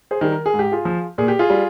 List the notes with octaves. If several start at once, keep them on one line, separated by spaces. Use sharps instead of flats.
G#4 C5
D#3 G3
A#4
G#4
G#2
G4
F4 G#4
F3
A#2 G#4
G4
F4 G#4
G3